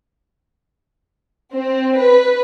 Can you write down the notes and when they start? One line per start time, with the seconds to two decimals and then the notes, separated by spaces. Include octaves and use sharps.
1.54 C4
1.99 B4